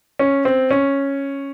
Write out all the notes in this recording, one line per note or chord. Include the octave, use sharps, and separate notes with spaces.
C#4
C4
C#4